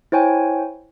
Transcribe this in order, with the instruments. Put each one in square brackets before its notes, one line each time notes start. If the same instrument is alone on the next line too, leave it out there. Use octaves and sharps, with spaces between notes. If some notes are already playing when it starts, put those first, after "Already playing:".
[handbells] E4 C5 C#5 G5 G#5